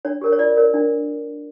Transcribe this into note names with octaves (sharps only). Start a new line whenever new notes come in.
D4 C#5
G4 A#4 C#5
C#5
F4 D5
A#4 C#5
D4